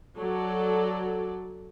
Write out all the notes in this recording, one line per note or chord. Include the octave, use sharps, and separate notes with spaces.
F#3 A4 D5